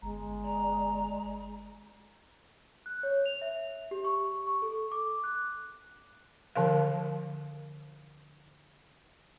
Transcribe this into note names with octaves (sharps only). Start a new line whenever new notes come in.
G1 G#3 A#5
D5 A#5
F#6
C#5
F7
E5
G4
C#6
C#6
A4
D6
F#6
D3 F3 A#4 F5